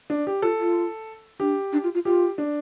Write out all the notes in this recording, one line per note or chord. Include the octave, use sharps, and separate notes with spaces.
D4
G4
F4 A4
F4
D4 G4
D4
F4
F4
F4 G4
D4